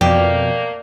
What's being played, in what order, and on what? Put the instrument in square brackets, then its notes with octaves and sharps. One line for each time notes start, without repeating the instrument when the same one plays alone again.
[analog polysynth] F2 B2 [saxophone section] A3 A#3 [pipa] G4 [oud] D5